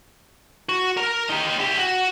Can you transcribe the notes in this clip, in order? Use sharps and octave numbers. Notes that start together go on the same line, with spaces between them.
F#4
A#4 A#5
D#4 G4
E4 G4
F#4